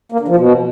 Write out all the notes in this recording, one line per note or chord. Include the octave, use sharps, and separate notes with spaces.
A#3
D3
F3
B2